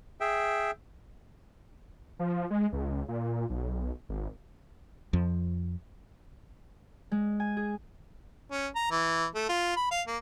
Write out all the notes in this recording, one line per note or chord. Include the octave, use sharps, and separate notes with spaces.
G#4 E5 G5
F3
G#3
C#2
A#2
B1
G#1
F2 F3
G#3
G#5
G#4
C#4
A#5
E3
A3
F4
B5
F5
A#3